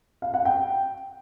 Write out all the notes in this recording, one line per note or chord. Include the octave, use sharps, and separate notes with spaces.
F5
F#5
G5